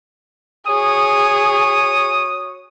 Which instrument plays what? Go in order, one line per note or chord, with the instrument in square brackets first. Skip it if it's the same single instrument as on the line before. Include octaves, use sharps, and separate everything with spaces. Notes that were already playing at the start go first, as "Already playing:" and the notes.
[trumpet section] F#4 C#5 D#6 [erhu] G#4